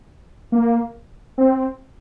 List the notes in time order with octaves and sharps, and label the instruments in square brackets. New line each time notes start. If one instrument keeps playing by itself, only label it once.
[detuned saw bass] A#3
C4